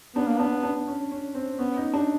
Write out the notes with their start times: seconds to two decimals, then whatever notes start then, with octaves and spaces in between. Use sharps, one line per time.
0.16 B3 D4
0.27 A#3
0.38 B3 D4
0.63 D4
0.87 C#4
1.11 C#4
1.35 C4
1.58 B3 C#4
1.77 D#4
1.93 D4